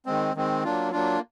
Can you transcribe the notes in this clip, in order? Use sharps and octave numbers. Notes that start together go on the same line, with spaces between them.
D#3 G#3 C4
D#3 G#3 C4
F#3 A#3 D4 F4
F#3 A#3 D4 F4